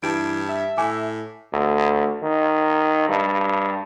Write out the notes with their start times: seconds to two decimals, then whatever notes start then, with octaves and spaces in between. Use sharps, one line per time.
0.03 G2 E3 A5 D7
0.49 E5
0.77 A2 G#5 D6
1.53 D2
2.23 D#3
3.09 G2